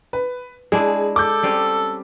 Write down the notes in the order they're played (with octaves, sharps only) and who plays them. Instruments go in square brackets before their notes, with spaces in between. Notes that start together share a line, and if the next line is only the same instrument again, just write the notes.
[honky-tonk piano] B4
[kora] G#3 D4 E4 [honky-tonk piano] G#4
[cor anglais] A4 [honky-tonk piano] D6 G6
[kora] G3 C4 C#4